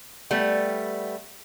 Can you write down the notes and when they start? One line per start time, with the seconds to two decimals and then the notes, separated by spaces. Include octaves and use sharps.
0.31 G3 A3 B3